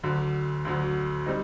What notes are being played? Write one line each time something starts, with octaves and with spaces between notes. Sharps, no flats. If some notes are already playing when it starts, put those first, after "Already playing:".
D2 D3 F#3
D2 D3 F#3
G3 C4 D#4